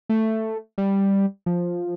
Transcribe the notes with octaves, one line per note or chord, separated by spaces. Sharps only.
A3
G3
F3